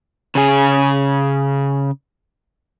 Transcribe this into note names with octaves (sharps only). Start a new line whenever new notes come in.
C#3 G#4